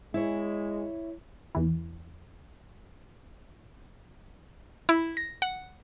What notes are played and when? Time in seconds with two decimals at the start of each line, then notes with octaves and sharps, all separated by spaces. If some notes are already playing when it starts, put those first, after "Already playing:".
0.14 G#3 E4 C#5
1.55 E2 E3
4.89 E4
5.17 A#6
5.42 F#5